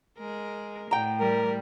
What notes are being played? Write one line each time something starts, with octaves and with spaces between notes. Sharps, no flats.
G#3 A#4
A2 G5 A#5
G3 A#4